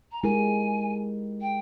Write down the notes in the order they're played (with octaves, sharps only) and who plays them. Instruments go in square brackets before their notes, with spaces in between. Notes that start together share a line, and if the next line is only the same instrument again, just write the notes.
[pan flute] A#5
[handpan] G#3 E4 G4 A#4 [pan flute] G#5
[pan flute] G5